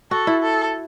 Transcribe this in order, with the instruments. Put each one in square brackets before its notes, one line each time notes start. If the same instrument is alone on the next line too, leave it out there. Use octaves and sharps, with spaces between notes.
[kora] F#4 [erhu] A4
[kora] E4
[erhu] A4